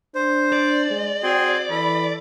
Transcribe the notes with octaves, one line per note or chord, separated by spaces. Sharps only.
D4 C5
D5
G#3
C4 F#4 G#4 G5 C6
E3 A4 B5